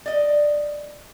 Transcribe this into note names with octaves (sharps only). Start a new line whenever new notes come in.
D5 D#5